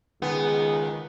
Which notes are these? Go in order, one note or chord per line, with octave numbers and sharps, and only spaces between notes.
C#2 D#3 B3 G#4